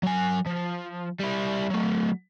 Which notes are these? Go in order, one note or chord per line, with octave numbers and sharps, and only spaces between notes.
F#3 G#5
F3
G3 E4
F#3 A3